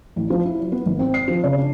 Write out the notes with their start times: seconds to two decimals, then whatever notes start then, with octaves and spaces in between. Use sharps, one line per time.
0.16 A1
0.30 F3
0.46 E4
0.60 F#3
0.72 B3
0.86 G#1
0.99 C4
1.14 C7
1.28 F3
1.44 C#3
1.58 D4